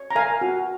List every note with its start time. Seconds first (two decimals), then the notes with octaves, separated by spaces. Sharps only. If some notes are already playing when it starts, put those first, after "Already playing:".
Already playing: C#5
0.11 A#5
0.15 A#4 F5 G#5
0.41 F#4